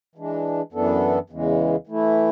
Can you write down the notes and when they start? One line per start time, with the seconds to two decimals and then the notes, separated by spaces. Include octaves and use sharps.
0.16 E3 G#3 D4
0.73 F#2 E3 B3 D4 A4
1.30 E2 C#3 E3 G#3
1.87 E3 A3 E4